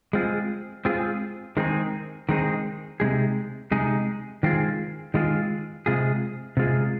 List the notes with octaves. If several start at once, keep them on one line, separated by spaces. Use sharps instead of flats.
G#3 C4 F4 G#4
G#3 C4 F4 G#4
D#3 G#3 C4 D#4 G#4
D#3 G#3 C4 D#4 G#4
C3 G#3 D#4 G#4
C3 G#3 D#4 G#4
D#3 G#3 C4 F4 G#4
D#3 G#3 C4 F4 G#4
C3 G#3 F4 G#4
C3 G#3 F4 G#4